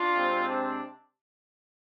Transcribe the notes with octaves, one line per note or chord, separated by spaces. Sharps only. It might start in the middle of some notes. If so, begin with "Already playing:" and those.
Already playing: D4 F4
C3 G#3 C4
D4